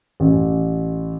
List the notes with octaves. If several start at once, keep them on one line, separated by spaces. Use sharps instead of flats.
A1